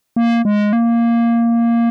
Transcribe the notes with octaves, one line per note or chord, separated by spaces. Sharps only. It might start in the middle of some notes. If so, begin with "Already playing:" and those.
A#3
G#3
A#3